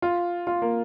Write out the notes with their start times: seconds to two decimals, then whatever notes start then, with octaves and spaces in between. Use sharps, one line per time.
0.02 F4
0.47 F4
0.62 A#3